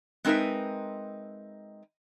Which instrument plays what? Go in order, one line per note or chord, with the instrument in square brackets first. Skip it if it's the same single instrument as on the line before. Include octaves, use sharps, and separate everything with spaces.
[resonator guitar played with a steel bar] G#3 C4 D#4 A#4 B4 E5